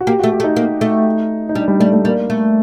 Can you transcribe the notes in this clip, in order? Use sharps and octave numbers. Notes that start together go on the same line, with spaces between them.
F#4
A#3 G4
F#4
A3
G4
A3
D#4
A#3
A3
D#4
G3 D4
G3
G3 A3
A3
G3 A#3
A3